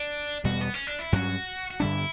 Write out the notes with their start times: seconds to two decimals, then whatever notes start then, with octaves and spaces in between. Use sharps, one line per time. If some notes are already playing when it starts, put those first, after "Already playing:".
Already playing: D4
0.44 E2 B2 G3 F#4
0.61 B3
0.74 C#4
0.87 D4
0.99 E4
1.12 G2 F#3 C#4 F#4
1.71 F#4
1.80 G2 D3 G3 D4 E4